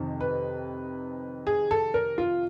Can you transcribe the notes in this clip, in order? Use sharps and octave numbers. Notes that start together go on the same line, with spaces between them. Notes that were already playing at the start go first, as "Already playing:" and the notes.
Already playing: F2 C3 D#3
B4
G#4
A4
A#4
F4